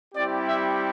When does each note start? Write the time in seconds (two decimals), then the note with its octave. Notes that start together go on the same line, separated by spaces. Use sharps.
0.14 G3 C4 E4 G4 D5
0.46 E5